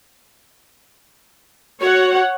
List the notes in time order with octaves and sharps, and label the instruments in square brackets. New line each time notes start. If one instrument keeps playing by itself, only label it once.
[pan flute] F#4 [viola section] C#5 F#5